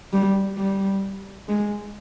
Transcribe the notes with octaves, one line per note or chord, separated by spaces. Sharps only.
G3
G3
G#3